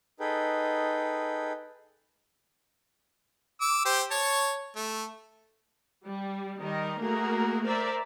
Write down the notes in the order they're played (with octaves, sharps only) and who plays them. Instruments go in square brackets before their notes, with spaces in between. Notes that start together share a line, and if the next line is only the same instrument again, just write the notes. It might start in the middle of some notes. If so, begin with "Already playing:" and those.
[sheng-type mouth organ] D#4 G#4 A4 B4 G5
[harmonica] D6 E6
G4 C5
C#5 A5 C#6
A3
[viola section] G3
D#3 G3 A#4 D#5
A3 A#3 F#4 G#4 A#4
A#4 C5 D5 E5